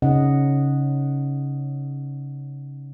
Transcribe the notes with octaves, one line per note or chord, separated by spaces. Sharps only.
C#3 C#4 D#4 D#5 F#5